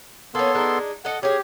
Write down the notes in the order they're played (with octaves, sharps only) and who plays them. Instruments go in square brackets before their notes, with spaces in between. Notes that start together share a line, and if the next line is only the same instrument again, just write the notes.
[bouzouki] A#3 C#4 [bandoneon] B3 A4 C6
[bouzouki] G#3 D4 D#4
[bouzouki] A4 D#5 [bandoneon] F#5
[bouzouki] C#4 G#4 [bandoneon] G4